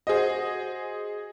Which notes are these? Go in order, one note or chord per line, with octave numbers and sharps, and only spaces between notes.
F#4 G#4 C5 D#5